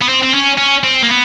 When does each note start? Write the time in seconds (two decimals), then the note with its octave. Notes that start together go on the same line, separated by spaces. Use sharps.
0.02 B3
0.09 C4
0.23 C4
0.34 C#4
0.58 C#4
0.84 C4
1.03 A#3
1.09 B3